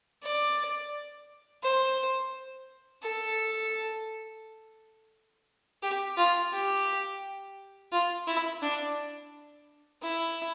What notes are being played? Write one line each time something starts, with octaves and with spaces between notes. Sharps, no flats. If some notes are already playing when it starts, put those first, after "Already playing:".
D5
C5
A4
G4
F4
G4
F4
E4
D4
E4